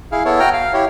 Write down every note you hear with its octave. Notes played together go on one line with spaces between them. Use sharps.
E4 G#4 F5
B3 E4 A4 C#5
F#4 G5 A#5 F6
F5
E4 G4 C#5